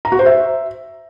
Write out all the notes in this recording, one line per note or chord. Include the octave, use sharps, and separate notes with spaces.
A#5
F#4
C5
E5